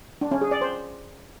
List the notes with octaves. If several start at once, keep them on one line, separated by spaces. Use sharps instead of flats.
D4
C#4
G#4
D5
C5